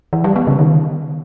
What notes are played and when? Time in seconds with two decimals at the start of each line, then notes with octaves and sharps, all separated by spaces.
0.13 E3
0.24 G3
0.36 B3
0.47 C#3
0.59 D#3